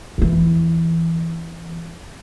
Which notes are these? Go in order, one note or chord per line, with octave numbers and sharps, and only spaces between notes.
E2 E3